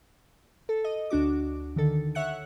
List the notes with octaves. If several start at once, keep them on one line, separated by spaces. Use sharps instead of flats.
A4
D#5
D2 D4 F#4 D6
D3 D#3 A4
C#5 E5 F#5 F#6 C#7